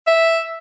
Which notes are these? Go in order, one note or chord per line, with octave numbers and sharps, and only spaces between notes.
E5